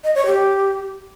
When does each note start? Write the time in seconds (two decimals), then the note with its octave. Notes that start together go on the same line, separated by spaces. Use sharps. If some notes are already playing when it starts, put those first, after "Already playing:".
0.04 D#5
0.15 C#5
0.26 G4